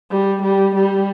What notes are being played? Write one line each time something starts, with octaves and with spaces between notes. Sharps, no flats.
G3
G3
G3